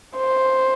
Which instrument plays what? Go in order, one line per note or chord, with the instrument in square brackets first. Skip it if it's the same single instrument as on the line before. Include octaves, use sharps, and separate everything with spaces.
[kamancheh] C5